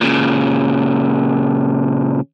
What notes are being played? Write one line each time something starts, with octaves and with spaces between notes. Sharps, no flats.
A#2 C#3